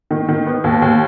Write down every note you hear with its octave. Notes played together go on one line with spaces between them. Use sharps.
D#3
D#3
B3
D#2
D#2